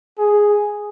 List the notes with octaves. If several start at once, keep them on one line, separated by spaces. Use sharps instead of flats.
G#4